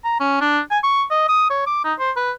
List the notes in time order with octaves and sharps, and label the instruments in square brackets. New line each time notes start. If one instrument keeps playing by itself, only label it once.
[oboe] A#5
C#4
D4
G#5
C#6
D#5
D#6
C#5
D6
D#4
C5
B4